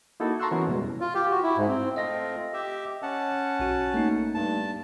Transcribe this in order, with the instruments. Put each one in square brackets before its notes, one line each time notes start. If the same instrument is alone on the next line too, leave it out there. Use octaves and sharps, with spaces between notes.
[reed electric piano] A#3 D#4 E4 F#4 A4
A5 A#5 C6 C#6 E6 F#6
E3 B3 C#4 E4 F#4 A#4
F2 B2 G3 G#3
[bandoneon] F4
G4
F#4
E4
G#2
C4
[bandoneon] A3 C4 F4 [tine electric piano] D#5 A#6
[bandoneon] G4 E5
C#4 F#5 A5
[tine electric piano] B1 F#4
A3 A#3 D#4
[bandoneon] G2 A5